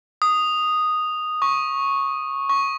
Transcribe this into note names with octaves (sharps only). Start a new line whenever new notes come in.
D#6
C#6
C#6